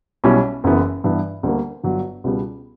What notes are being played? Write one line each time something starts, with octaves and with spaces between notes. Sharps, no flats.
B1 B2 G3 C#4 E4
F#1 F#2 E3 B3
G2 E3 B3
D2 D3 G3 A#3
G1 G2 D3 F#3
C#2 B2 G3 B3